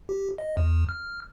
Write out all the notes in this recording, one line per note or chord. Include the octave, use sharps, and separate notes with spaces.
G4
D#5
E2
F6